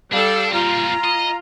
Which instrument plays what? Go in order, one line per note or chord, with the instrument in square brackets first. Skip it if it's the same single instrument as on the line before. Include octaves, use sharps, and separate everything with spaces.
[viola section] G3 A4 [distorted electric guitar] D4 [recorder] F5
[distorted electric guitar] A#2 C4 [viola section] F4 [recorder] A#5
[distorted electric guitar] D#5